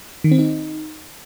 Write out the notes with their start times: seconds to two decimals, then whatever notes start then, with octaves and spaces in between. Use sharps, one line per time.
0.24 D#3
0.32 C4
0.39 D#4